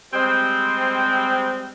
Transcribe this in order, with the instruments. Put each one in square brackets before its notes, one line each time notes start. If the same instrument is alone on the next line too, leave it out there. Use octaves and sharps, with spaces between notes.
[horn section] G3 G#3 C4